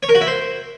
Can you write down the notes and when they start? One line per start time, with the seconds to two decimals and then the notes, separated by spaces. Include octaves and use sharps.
0.03 C#5
0.09 A#4
0.15 F#4
0.21 E4
0.27 C5